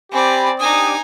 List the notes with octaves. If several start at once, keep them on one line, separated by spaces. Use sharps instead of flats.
C4 G4 D5 G#5 B5
D4 D#4 G4 G#5 D#6